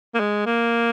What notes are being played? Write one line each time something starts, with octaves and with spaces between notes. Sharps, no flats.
A#3
G#3
A#3